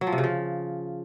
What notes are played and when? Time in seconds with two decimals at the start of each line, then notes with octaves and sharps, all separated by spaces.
0.01 F#3
0.07 F3
0.12 C3
0.18 C#3
0.23 F3